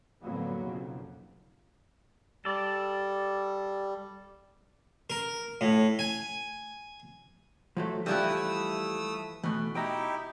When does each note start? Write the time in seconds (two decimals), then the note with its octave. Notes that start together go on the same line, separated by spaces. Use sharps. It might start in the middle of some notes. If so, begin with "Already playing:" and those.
0.23 F2 A2 D3 F#3 A#3 B3
0.62 B1 F2 C#3
2.45 G3 A4 D5
5.10 A#4
5.61 A2
5.99 G#5
7.77 F3 F#3 A3
8.06 E3 F3 G3 A3 E4 G4 D#6 E6
9.43 B2 E3 A3
9.75 D#4 E4 G4 G5 A#5